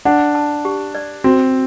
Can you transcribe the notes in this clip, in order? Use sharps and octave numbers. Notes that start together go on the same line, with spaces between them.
D4 F#5
A5
G4
D5
C4 F#4